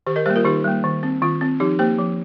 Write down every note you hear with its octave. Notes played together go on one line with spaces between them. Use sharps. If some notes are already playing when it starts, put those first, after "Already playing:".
D#3 G4 C5
A#4 D#5
G3 A#3 G4 C5
F4 A#4
D#3 D#4 G4
G3 A#3
D#3
C4
D#3 F4
C4
F3 D#4 G4
A#3 G4 C5
F3